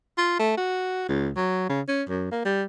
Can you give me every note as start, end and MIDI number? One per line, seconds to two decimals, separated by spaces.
0.18 0.37 65
0.39 0.53 57
0.58 1.06 66
1.08 1.30 37
1.36 1.65 54
1.70 1.81 49
1.88 2.03 61
2.09 2.28 42
2.32 2.45 58
2.45 2.63 55